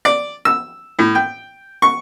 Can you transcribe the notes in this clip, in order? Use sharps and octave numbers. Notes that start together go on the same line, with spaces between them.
D5
E6
A2
G5
C#6